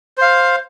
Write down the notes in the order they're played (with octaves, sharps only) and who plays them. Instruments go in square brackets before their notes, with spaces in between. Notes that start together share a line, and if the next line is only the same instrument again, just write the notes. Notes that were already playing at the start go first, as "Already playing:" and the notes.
[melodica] C5 F5